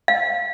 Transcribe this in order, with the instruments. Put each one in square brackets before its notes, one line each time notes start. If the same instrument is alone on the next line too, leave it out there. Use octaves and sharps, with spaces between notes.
[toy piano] F5